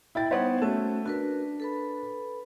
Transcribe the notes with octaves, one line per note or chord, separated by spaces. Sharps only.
E4 G5 A6
G3 B3 D#4 C5 C#5 F#5
A3 C#4 F#4
D4 F#4 A#4 B4
A4 B4 B5